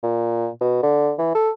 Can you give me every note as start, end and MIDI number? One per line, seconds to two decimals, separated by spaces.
0.03 0.49 46
0.61 0.80 47
0.83 1.13 50
1.19 1.33 52
1.35 1.50 69